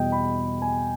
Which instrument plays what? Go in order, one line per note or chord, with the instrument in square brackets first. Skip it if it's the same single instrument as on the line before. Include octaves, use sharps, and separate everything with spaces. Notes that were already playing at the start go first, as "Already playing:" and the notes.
Already playing: [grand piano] E2 B2 G3 D#5 G5
B5
G#5